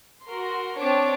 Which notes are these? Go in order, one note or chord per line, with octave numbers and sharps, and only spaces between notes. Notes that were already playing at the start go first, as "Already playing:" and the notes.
F#4 A#4 C6
C4 D4 C#5 A5 D6